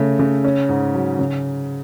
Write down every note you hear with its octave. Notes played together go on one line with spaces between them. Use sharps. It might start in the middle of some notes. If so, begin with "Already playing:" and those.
Already playing: C#3 A3
C#3
C#4
G#2
F#3
C#3